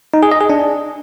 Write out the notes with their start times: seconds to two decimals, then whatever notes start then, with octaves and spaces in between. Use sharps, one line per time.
0.14 D#4
0.23 G#4
0.32 D#5
0.41 G#4
0.50 D4